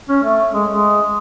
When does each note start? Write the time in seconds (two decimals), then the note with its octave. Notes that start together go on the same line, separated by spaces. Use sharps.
0.09 C#4
0.23 A3
0.54 G#3
0.69 G#3